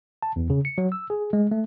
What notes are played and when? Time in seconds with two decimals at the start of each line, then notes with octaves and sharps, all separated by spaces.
0.22 A5
0.36 E2
0.50 C#3
0.65 C#7
0.78 F#3
0.92 E6
1.10 G#4
1.33 G#3
1.51 A3